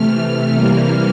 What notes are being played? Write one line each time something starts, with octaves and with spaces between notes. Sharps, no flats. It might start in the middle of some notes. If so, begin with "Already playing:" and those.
Already playing: C3 E3 A3 F6
C3 E3 G3 A#3